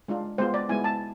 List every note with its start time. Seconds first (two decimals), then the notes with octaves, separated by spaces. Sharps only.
0.08 G#3 D4 F4
0.38 G#3 B3 F4 C5
0.54 D5
0.69 G#3 B3 E4 G#5
0.84 A5